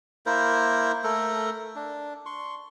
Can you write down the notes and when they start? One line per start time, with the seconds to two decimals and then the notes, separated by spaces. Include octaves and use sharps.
0.26 A#3 E4 A#4 C5
1.04 A3 A4 A#4
1.76 D4
2.26 C6 C#6